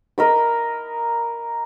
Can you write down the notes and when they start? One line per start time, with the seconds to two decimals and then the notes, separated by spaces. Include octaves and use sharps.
0.18 A#4 D#5 B5